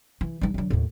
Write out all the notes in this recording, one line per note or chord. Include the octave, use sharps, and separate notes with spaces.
E3
G3 D#4
D3 F#3
D#2 A2